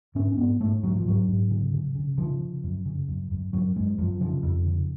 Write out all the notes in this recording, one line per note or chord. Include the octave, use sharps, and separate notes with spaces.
G#2 C#4
C#4
G#2 B3
G#2 A3
G#2 F#3
F3
G#2 F#3
G#2
C#3
C#3
C#3
C#3 F3
C#3
F#2
C#3
F#2
F#2
F#2 F#3
F#2 G#3
F#2 F3
C#3 F3
F2
C#3